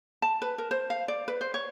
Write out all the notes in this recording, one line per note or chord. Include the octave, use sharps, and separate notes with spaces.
A5
B4
A#4
C5
F5
D5
B4
C5
C#5